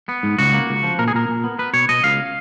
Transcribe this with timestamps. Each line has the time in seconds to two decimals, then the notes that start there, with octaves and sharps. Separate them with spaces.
0.09 B3
0.23 G#2
0.38 C#2 F#4
0.53 A#3
0.69 C#2
0.83 F3
0.99 A#2 A#4
1.08 G#4
1.14 A#2 A#4
1.28 A#2
1.44 B3
1.59 B3 B4
1.73 B2 C#5
1.89 B2 D#5
2.04 C#2 F5